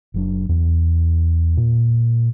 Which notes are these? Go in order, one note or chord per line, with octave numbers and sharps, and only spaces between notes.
F#1 F#3 D4
E2
A#2